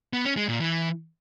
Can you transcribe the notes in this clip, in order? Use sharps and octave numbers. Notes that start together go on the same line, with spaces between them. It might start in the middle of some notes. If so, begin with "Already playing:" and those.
B3
C#4
G#3
A#2
E3